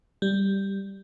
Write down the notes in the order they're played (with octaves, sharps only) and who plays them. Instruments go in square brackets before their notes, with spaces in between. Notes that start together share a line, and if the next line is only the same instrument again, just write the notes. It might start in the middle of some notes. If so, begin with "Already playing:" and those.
[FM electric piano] G3